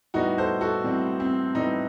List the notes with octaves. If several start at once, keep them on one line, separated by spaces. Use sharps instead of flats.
A2 G3 B3 D#4 F#4
A4 C5
F#4 A4
A2 G3 B3 C4
C4
A2 G3 B3 D#4